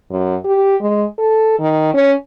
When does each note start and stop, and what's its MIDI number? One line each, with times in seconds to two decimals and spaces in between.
0.11 0.35 42
0.44 0.75 67
0.81 1.05 56
1.18 1.58 69
1.59 1.92 51
1.94 2.13 61